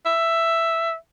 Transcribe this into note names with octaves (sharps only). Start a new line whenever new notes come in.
E5